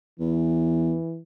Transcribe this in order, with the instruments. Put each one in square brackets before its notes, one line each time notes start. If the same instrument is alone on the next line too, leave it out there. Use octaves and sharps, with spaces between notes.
[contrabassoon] E2 [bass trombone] E3